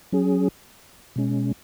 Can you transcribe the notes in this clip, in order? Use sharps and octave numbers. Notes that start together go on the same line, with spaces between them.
F#3 C#4 G#4
B2 G#3 C#4